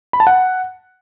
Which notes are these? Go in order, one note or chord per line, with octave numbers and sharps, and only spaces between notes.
B5
A5
F#5